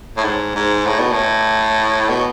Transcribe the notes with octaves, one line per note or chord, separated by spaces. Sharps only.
A2
G#2
G#2
A2
B2
A2
B2